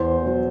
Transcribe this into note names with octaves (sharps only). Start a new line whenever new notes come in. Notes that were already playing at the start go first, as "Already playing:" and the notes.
Already playing: E2 C5
B2 F#3